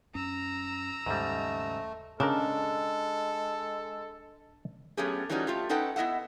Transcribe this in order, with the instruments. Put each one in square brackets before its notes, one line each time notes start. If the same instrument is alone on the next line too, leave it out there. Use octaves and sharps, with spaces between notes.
[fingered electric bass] F#2 C#4 [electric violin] A#5 E6
[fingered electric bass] D#2 C#3 [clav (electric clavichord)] G#2 G3 [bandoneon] A3
[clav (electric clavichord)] C#3 A#4 [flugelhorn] G#3 [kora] D4 [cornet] A4
[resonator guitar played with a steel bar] F#3 A3 B3 C#4 G4 G#4
E3 G3 A3 C#4 D#4 F#4
A3 F4 G4
C#4 D#4 A4 B4 F#5 G5
B3 E4 D#5 E5 F#5